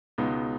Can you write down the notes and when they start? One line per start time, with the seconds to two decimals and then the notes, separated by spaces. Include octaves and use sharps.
0.18 C#2 B2 G#3 B3 D#4